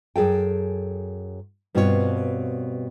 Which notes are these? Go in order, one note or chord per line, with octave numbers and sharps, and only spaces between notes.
F#2 G#4 A4 G5
G2 B2 C4 F4 F#4 C#5